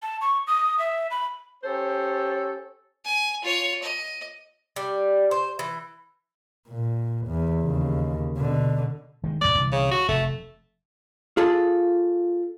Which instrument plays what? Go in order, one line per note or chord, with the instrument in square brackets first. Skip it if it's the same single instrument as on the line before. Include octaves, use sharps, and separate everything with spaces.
[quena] A5
C#6
D#6
E5
B5
[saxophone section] C#4 G4 A4 C5 C#5
[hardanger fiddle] G#5
F4 C#5
D#5
[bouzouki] G3
C5
E3
[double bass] A#2
E2
D#2 C#3
B2 D3
[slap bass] D#3 G#3
[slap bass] F2 G#3 [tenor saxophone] D5
[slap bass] C2 D3 E3
[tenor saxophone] C#3
F#4
[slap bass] F1 [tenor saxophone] A3
[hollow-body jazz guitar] F4 G#4 A4